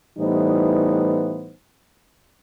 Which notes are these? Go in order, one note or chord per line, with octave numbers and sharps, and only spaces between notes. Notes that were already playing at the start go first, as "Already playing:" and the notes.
A2 E3 G3 B3 D#4 C5